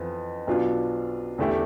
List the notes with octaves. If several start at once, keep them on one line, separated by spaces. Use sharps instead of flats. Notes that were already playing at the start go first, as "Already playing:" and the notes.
Already playing: F2 E3 B3 F4
B1 B2 B3 D4 F4
E2 D3 A3 E4 G4